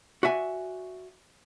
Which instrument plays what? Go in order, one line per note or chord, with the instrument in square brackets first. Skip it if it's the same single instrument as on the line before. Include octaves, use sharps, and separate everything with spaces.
[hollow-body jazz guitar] F#4 D5 E5 G#5